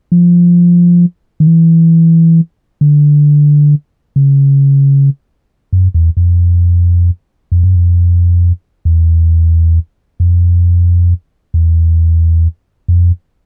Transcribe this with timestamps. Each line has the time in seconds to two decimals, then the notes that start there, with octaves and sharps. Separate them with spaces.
0.12 F3
1.40 D#3
1.47 E3
2.81 D3
4.16 C#3
5.73 F#2
5.94 E2
6.17 F2
7.52 F2
7.63 F#2
7.76 F2
8.85 E2
10.20 F2
11.54 E2
12.88 F2